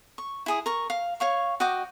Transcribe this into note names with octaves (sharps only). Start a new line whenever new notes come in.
C#6
E4 G#4 D#6
A#4 C#6
F5
C#5 F5 C#6
F#4 D#5 G5 D6